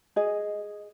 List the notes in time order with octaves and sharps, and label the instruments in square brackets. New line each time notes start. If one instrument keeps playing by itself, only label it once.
[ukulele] G#4 D#5